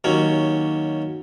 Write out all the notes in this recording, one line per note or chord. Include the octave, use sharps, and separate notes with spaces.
D#2 F#3 C#4